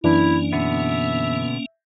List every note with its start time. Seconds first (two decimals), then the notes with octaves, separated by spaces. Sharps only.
0.04 F#2 E3 A#3 C#4 D4 E4
0.53 B2 D3 B3 E5